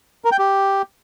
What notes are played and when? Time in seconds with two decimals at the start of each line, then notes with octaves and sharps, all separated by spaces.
0.25 A#4
0.32 G5
0.39 G4